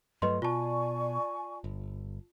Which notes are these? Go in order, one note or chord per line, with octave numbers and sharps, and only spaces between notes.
G2 F#3 A3 B4 D#5 C6
B2 F4 D5 G#5 A5 C#6
G1